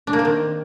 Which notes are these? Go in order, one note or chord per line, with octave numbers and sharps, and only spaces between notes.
D4
A#3
C4
D#3